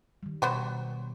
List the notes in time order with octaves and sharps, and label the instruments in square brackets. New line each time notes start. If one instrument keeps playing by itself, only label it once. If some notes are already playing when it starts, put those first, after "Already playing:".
[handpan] D#3 G3
[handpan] B2 [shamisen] F#3 B3 C5